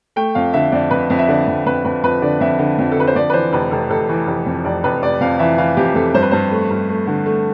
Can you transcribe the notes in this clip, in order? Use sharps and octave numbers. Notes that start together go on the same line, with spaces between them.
A3 G5
F2 F5
D3 E5
F2 D5
F2 B4
F2
E5
D3 D5
F2
F2 B4
F2 B4
F2 B4
D3 D5
F2 E5
D3
F2
A4
D3 B4
C5
F2 D5
B4
E3 C5
F1 B4
F1 A4
F1 A4
E3
F1
F2
F1 D5
F1 B4
F1 D5
F2 F5
E3 E5
E3 F5
F2 G4
F2 A4
G2 C5
B4
G2 C5
A3
G2
A3
D3
A3